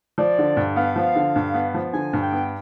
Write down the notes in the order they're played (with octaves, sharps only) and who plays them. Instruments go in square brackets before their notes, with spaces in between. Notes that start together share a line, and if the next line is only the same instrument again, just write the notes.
[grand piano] F3 [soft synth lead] D5
[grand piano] D3
G2
[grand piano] B3 [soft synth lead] F5
[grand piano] F3
D3
G2
B3
F3
[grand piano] D3 [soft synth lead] G#5
[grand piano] G2
[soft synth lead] G5
[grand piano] B3